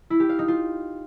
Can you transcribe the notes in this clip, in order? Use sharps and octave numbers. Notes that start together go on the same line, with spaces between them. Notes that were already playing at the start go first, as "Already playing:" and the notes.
E4
G4
F5
D#4
F4